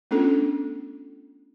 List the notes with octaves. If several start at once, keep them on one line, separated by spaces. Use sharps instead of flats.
A3 B3 C#4 D4 F4 A4